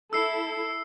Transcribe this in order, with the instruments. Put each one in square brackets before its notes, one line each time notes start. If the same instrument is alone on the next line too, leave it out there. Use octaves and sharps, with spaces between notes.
[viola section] E4 A4 [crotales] E6 C7